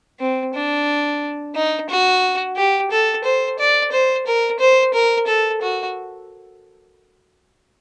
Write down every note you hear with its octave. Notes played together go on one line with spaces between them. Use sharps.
C4
D4
D#4
F#4
G4
A4
C5
D5
C5
A#4
C5
A#4
A4
F#4